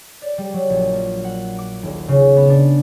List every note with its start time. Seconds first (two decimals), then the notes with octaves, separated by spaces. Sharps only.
0.22 D5
0.38 G3
0.54 F#3
0.70 A#1
0.93 A#3
1.24 F#5
1.59 D6
1.83 D#1
2.08 C#3
2.37 B3
2.50 D4